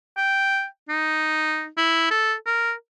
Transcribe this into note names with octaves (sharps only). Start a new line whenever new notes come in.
G5
D#4
E4
A4
A#4